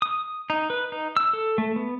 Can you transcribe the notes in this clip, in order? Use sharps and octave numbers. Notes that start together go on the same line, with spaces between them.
D#6
D#4
B4
D#4
E6
A4
A3
B3